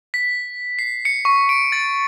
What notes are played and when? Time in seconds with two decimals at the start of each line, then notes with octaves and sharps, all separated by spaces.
0.14 B6
0.79 C7
1.05 C#7
1.25 C#6
1.49 D7
1.72 A6